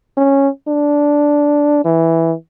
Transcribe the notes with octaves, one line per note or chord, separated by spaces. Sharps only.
C#4
D4
E3